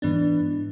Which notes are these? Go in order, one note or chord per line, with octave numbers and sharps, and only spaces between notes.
G#2 E3 B3 D4